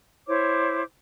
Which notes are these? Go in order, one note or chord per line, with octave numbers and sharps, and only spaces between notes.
E4 C5 C#5 D6